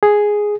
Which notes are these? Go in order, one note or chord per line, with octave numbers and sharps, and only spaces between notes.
G#4